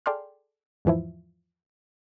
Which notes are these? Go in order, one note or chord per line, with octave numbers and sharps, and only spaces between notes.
G#4 A4 D5 G5 C6 F6
E2 G#2 E3 F3 E4